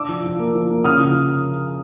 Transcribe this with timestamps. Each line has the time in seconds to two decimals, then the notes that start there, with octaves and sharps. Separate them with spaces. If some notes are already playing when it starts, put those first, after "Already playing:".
Already playing: D4 D6 E6
0.09 F3
0.24 F3
0.39 A#3
0.55 F3
0.70 A#3
0.84 C#3 D#6 F6
1.00 F3